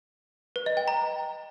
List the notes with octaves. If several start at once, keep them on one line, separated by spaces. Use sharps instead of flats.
B4
D#5
G5
A#5